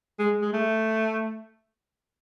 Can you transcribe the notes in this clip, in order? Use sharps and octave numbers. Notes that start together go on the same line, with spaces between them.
G#3
G#3
A3